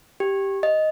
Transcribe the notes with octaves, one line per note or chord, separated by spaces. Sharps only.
G4
D#5